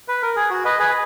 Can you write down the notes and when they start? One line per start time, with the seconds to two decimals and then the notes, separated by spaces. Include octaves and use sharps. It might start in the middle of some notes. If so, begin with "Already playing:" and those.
0.08 B4
0.22 A#4
0.36 G#4
0.50 F#4
0.65 B4 D#5
0.79 G#4 B4